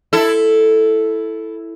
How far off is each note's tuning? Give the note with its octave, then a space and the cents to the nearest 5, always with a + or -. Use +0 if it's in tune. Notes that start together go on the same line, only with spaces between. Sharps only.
E4 +0 A4 +0